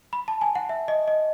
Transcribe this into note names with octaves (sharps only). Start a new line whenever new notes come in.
B5
A5
G#5
F#5
E5
D#5
D#5